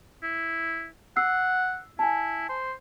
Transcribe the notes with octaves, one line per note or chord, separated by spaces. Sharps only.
E4
F#5 E6 C7
E4 G#5 A5
C5